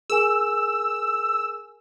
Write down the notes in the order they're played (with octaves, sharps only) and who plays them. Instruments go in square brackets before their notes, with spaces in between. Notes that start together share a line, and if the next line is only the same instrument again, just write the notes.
[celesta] G#4 A#4 G#5 [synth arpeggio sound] E6